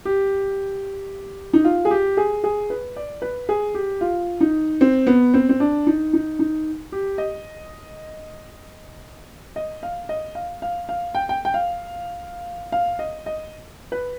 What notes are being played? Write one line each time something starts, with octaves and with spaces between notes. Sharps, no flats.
G4
D#4
F4
G#4
G4
G#4
G#4
B4
D5
B4
G#4
G4
F4
D#4
C4
B3
C4
C4
D4
D#4
D#4
D#4
G4
D#5
D#5
F5
D#5
F5
F5
F5
G5
G5
G5
F5
F5
D#5
D#5
B4